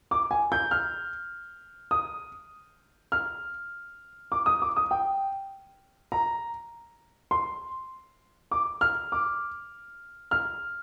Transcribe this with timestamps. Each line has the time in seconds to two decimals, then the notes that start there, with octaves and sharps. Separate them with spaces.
0.11 D6
0.31 G#5
0.52 G6
0.71 F6
1.91 D#6
3.12 F6
4.32 D6
4.46 D#6
4.62 D6
4.76 D#6
4.91 G5
6.12 A#5
7.31 C6
8.51 D6
8.81 F6
9.12 D6
10.31 F6